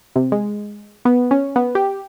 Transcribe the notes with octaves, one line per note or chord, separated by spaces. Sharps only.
C3
G#3
B3
C#4
B3
G4